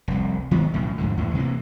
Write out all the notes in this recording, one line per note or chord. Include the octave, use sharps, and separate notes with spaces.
F1 C2
D#3 G#3 B3
B1 A2 C#3
F2 G#2 D3
E2 A2 E3
C3 E3 A#3